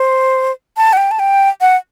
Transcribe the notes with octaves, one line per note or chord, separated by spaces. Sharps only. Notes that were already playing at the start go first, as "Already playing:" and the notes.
Already playing: C5
A5
F#5
G5
A5
G5
F#5